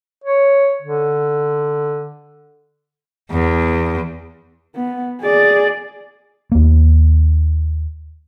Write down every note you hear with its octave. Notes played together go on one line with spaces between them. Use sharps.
C#5
D3
E2
B3
G#4 D5
D#2 A#3